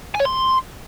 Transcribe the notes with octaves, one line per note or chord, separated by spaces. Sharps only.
G#5
C#5
C6